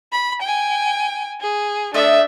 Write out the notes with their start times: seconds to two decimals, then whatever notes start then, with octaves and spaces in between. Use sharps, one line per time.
0.12 B5
0.42 G5 G#5
1.41 G#4
1.94 A3 D4 D#5 E5